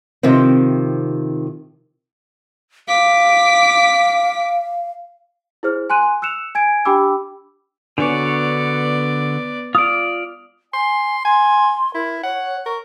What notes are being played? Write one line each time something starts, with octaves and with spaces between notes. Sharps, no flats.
C3 D#3 F3 C4
F5 D6 B6
E4 G#4 C5 F6
G#5 C6 F#6 D#7
E6 F#6 C#7 E7 F7
G#5 G#6 D7
D4 G4 G5 B5 D6 E6
D3 B3 D4 F#4 C#5 D5
F4 D5 D#6
G#5 C6
G#5 C6
E4 A#4
C#5 F#5
A#4 C#6